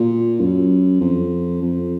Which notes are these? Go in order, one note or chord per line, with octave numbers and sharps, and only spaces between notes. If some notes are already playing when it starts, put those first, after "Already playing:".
Already playing: A#2
F#2
F2
F2